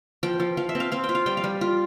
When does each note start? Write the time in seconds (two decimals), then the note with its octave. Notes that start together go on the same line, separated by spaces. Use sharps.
0.23 F3 G5
0.40 F3
0.57 F3 F5
0.69 E5
0.75 C4
0.80 F5
0.92 C4 F5
1.04 G5
1.09 F4
1.15 F5
1.26 G3 G5
1.37 F5
1.44 G3
1.61 F4